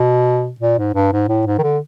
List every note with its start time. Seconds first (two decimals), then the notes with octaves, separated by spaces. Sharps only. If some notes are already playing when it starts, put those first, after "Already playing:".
Already playing: B2
0.61 A#2
0.79 G#2
0.95 G2
1.13 G#2
1.29 A2
1.47 G#2
1.59 D#3
1.63 D3